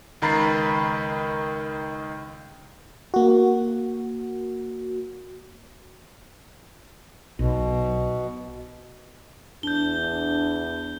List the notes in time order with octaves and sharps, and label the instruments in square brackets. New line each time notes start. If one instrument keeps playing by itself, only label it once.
[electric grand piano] C#2 D#3 A#5 B5 A6 C7
[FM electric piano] A#3 F#4
[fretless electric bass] B1 [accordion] B2
[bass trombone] E2 [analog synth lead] D4 [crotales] G6 G7